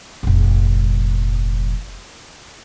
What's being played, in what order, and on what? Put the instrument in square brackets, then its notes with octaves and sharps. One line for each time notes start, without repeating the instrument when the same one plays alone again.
[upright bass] F1 A#1